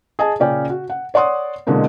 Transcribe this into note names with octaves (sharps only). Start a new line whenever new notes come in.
G#4 D#5 G#5 A5
A#2 C#3 C#4 D5 G5
F#4
F#5
C#5 D5 F#5 C6 D#6
B2 D3 E3 G#3 A#3 C4